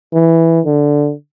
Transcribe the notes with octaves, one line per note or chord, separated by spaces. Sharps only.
E3
D3